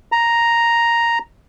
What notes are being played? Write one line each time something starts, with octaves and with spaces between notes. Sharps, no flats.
A#5